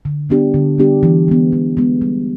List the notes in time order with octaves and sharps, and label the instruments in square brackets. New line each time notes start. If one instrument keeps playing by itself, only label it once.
[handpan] D3
G3 B3 D4 G4
D3
G3 B3 D4 G4
E3
G#3 B3
E3
G#3 B3
G3